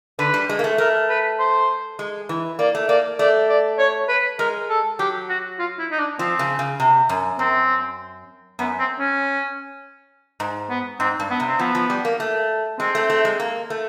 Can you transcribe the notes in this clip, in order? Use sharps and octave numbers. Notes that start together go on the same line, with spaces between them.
D3 B4
G3
G#3
A#3
A3
A3 A#4
B4
C5
G#3
E3
A#3 D5
A3
A#3 D5
A3 D5
D5
C#5
B4
G#3 A#4
A4
F#3 G4
F#4
F4
E4
D#4
D4
F3 C4
C#3
C#3
C3
F#2
F#2 C4
F#2 B3
C4
C#4
G#2
B3
G#2 C4
G2
B3
C3
C4
F3 B3
F3
G3
A#3
A3
G#3 C4
A3
A3
G#3
A#3
A3